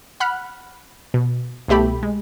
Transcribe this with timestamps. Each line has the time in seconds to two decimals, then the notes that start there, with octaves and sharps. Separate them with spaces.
0.20 F#5 B5 F6 F#6
1.14 B2
1.68 C2 B2 A3 G4 B5
2.03 G#3